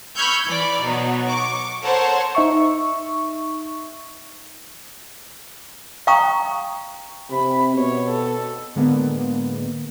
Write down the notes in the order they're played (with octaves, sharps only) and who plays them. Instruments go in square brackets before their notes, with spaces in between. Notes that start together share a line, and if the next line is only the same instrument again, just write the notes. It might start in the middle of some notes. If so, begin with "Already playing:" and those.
[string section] B5 C#6 E6 F6 G6 G#6
E3 D5 B5 D6
B2 F#3 B3 D#4
C#6 D6
A4 A#4 C5 C#5 F#5 A5
[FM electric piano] D#4 E5 C#6
[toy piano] F5 G5 A#5 C#6 D#6
[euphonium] C3 [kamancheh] B5
[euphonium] B2 [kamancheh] C#5
[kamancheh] A4
[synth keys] A2 D3 G#3 A#3 B3